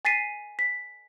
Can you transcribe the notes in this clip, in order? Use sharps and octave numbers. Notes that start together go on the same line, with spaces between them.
G#5 A6 B6 C7 D#7
B6